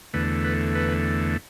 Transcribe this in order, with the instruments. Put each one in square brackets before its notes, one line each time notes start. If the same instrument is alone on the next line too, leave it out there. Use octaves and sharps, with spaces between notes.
[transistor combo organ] E2 D3 A3 B4
B4
B4